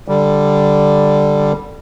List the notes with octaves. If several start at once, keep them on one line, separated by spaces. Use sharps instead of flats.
D3 G3